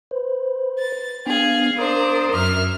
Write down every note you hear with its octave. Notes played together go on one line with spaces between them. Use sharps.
B4 C5
A6
B3 D4 G#4 F5
D4 A#4 C5 A#5 D#6
F#2 E5 F6